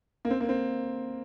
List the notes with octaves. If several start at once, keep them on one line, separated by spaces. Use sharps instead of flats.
A#3
C4
A#3
C4